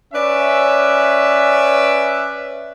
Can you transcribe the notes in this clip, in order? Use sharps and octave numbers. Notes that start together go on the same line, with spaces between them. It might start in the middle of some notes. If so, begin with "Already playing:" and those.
C#4 B4 D5 E5